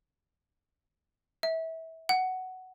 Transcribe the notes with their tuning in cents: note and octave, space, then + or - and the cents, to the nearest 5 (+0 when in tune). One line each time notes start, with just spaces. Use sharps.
E5 -25
F#5 +10